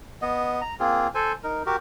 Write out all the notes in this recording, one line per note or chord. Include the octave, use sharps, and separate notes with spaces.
B3 D#5
A#5
A#3 C4 F4 G#4
A4 C5 G#5
D#4 A#4
F#4 G4 A#4